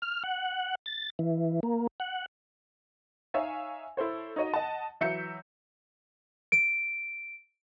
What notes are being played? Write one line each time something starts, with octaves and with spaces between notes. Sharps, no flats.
F6
F#5
A6
E3
A#3
F#5
D#4 C#5 E5 F5 G#5
E4 A4 C5 C#5
D#4 F#4 C#5 D#5
D#5 F#5 A5
E3 F#3 E5 G6 C#7
D7